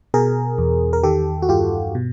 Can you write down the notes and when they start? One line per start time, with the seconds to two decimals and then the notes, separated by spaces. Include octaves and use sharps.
0.14 B2 G#4 A#4
0.58 E2
0.93 A#4
1.03 D#3 G4 A4
1.42 F#4
1.49 G2 F4 G4
1.95 B2